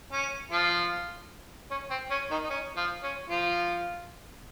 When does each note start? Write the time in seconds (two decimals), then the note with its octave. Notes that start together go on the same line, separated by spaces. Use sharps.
0.12 C#4
0.51 F3 F4
1.71 C#4
1.90 C4
2.11 C#4
2.31 D#3 D#4
2.44 D#4
2.50 C#4
2.77 F3 F4
3.03 C#4
3.30 F3 F4